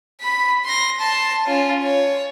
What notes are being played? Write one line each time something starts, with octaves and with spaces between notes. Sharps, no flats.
B5 B6
C6 A#6
A5 C6
C#4 F4
C#5